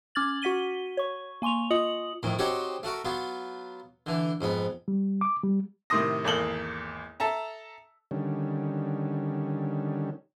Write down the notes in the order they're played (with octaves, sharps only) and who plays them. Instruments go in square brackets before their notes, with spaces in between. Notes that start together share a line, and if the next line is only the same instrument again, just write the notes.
[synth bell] C#4 D6 F6 G#6 A6 F#7
F#4 F#5 B6 D#7 G7
C#5 C#6
A#3 G#5 C6 C#6 F7
F4 D#5 D#6 C#7 F#7
[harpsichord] F2 A2 D#3
C4 D#4 F#4 G4 C#5
A3 F#4 A#4
F#3 B3 F4
D3 E3
F2 G#2 B3
[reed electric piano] G3
D6
G3
[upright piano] A2 C3 D#3 C6 D#6 A#6
G#1 E2 A#3 A4 F#7 G7
A4 E5 A5 A#5
[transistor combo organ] D3 D#3 G3 C#4